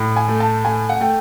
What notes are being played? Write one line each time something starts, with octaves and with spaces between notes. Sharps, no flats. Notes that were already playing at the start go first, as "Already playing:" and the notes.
Already playing: A2
G#5
A3
A5
A3 G#5
F#5
A3 G5